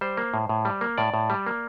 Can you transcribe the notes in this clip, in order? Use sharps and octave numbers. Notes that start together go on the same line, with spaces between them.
G3 C5
A#3
A2
A2
G3
A#3
A2 D5
A2
G3
A#3